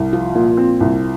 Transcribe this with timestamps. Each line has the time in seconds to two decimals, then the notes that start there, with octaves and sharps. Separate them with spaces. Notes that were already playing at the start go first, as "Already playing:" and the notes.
Already playing: C2
0.13 F3 F4
0.35 A#2
0.57 C4
0.80 C2